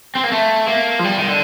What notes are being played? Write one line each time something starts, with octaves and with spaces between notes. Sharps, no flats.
C4
A#3
A3
A#3
F3
G3
D#3
D3